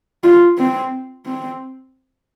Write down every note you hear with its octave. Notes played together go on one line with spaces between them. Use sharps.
F4
C4
C4